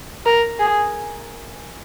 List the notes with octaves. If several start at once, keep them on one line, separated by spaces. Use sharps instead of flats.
A#4
G#4